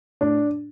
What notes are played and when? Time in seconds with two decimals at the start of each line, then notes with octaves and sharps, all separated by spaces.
0.21 A2 D4